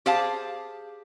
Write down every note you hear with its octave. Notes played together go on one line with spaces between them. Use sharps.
G4 G#4 C5 F5 A5